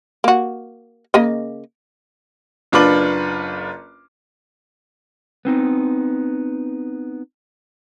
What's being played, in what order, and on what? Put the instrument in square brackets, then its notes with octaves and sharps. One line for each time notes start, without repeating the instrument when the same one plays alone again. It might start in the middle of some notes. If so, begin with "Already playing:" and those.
[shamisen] A#3 F#4
C#3 A#3 D#5
[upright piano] F#1 D4 F4 B4 D6 F#7
[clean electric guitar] B3 C4 D#4